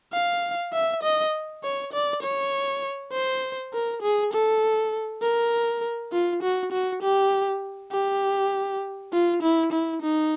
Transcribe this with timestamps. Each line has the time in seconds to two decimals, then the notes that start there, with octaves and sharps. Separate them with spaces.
0.13 F5
0.73 E5
1.03 D#5
1.64 C#5
1.93 D5
2.23 C#5
3.13 C5
3.73 A#4
4.02 G#4
4.33 A4
5.22 A#4
6.12 F4
6.43 F#4
6.72 F#4
7.03 G4
7.92 G4
9.13 F4
9.42 E4
9.73 E4
10.02 D#4